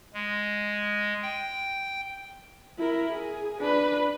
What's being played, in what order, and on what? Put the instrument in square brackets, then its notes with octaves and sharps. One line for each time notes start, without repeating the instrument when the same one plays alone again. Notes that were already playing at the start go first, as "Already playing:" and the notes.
[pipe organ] G#3
G5
[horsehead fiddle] E4 A#4
G#4
D4 B4